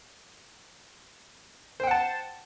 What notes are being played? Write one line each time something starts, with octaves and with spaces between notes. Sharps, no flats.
C5 F#5 G5 A5